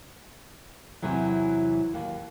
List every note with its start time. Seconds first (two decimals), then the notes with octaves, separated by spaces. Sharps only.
1.02 E2 C3 E3 F#3
1.94 D#2